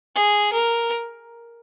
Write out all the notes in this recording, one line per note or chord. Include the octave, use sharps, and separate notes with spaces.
G#4
A#4